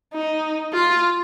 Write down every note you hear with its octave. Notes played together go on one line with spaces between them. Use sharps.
D#4
F4